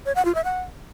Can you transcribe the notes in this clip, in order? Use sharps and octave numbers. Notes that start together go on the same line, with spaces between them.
C#5
F#5
F4
E5
F#5